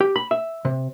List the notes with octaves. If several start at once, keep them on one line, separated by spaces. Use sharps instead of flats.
G4
B5
E5
C3